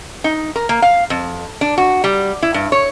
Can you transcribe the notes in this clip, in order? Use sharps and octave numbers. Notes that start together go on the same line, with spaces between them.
D#4
A#4
A#3
F5
F2
D4
F#4
G3
E4
G2
C#5